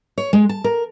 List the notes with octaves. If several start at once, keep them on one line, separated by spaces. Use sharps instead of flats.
C#5
G#3
A5
A#4